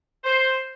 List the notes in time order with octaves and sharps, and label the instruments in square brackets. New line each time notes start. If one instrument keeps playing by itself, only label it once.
[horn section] C5